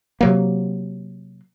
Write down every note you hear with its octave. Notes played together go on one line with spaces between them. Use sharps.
C3 F#3 A#3